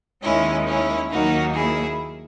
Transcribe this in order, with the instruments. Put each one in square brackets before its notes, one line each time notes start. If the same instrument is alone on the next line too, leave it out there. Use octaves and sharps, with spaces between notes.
[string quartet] D#2 D#3 G#3 C#4 E4
C#4 E4
D#2 D#3 F#3 A#3 D#4 F#4
E4 G#4